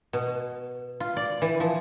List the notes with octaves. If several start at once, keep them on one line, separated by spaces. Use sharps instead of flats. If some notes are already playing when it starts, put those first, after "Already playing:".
B2
F4
D5
E3
F3